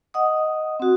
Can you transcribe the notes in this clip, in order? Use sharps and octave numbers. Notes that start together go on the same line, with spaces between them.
D#5 F#5 D#6
C4 F#4